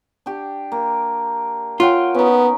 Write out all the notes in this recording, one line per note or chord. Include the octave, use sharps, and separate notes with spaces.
D4 G4
A#3
F4 C#5 F#5 G5
B3 C#4 D#4